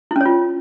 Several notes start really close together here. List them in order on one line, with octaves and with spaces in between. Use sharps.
E4 C#4 C#5 F4